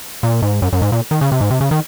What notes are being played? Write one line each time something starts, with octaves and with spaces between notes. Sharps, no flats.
A#2
G#2
F#2
F#2
G#2
A#2
D#3
C#3
C3
G#2
C3
C#3
D#3